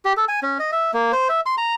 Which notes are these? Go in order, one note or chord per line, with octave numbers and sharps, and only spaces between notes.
G4
A4
G#5
C#4
D#5
E5
A#3
C5
E5
C6
A#5